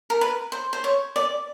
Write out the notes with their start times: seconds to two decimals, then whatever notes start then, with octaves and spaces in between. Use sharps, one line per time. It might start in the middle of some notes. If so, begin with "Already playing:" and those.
0.10 A#4
0.21 B4
0.52 C5
0.73 C5
0.84 C#5
1.16 D5